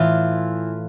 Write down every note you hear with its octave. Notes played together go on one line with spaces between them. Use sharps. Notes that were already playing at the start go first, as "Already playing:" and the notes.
Already playing: A2 E3 F4